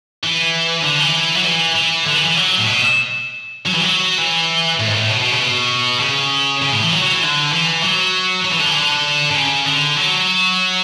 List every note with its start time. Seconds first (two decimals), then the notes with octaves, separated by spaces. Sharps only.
0.23 E3
0.83 D3
0.99 E3
1.35 F#3
1.44 E3
1.75 E3
2.06 D3
2.15 E3
2.25 E3
2.36 F#3
2.58 A2
2.66 B2
3.66 F#3
3.74 E3
3.82 F#3
4.18 E3
4.79 A2
4.87 G#2
4.94 A2
5.09 B2
5.20 B2
5.31 C#3
5.40 B2
6.00 C#3
6.62 C#3
6.72 A2
6.82 E3
6.92 F#3
7.02 F#3
7.13 E3
7.23 D3
7.53 E3
7.84 F#3
8.45 F#3
8.52 E3
8.59 D3
8.66 E3
8.75 D3
9.31 D3
9.35 C#3
9.66 D3
9.97 F#3